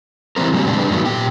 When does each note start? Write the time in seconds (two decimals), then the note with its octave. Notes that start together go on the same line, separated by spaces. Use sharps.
0.36 E3 G3 A#3 C4 A#4
0.53 C#3 F#3 G3 A#3 C4 G4
0.66 A#2 C#3 G#3 C4 D4 G4
0.78 D3 G3 D4 G#4 B4
0.91 G2 D#3 F#3 A3 B3
1.06 A#2 G4 G5